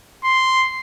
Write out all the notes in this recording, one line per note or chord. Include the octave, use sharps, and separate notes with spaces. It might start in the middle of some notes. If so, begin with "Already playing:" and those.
C6